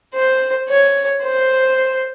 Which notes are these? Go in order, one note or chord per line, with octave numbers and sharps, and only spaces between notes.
C5
C#5
C5